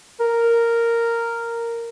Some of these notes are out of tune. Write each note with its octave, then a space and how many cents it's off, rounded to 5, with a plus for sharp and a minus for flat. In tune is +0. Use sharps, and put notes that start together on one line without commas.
A#4 -5